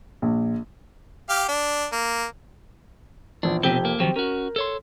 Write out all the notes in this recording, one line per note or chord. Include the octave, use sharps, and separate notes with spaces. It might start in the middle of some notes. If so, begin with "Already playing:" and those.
A#1
G4 F5
D4
A#3
A#1 E2 D4
F1 B2 C4 G4 G7
A#3
D#3 F3 F#3 C4 G4
C#4 F#4 A#4
A4 C#5 C6